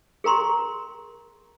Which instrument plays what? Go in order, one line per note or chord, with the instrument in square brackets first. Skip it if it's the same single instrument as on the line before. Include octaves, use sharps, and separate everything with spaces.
[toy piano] G#4 A#4 A#5 C6 C#6